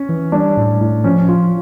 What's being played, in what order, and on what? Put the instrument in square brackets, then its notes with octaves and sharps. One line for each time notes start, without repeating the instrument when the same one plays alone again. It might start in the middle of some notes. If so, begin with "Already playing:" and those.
Already playing: [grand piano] C#4
[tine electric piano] E3
[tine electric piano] G3 [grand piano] D4
[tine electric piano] A2
A2
[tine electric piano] F3 [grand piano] C#4
[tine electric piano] F4